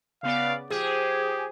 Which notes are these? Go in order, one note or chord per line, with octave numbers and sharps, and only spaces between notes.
C#3 B3 D5 F5
F3 G4 G#4